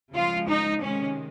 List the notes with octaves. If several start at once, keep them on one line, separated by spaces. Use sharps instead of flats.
C#3 F3 G#3 F4
D#4
C3 D#3 G#3 C#4